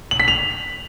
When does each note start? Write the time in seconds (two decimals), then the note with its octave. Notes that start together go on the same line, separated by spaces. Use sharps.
0.11 F#7
0.20 B6
0.28 F7